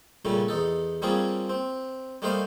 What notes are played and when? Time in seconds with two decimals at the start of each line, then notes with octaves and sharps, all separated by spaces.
0.25 A#2 C#3 G3 A3
0.48 E2 D#4 A4
1.02 G3 A#3 C4 C#4 F4 G#4
1.49 C4
2.22 G3 A3 A#3 D#4 C5 F5